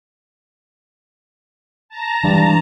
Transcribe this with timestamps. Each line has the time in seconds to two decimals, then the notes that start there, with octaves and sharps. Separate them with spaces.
1.89 A5 A#5
2.23 G2 E3 G#3